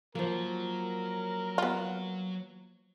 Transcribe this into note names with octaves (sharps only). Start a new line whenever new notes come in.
F3 F#3 A#3 A#4
B3 F4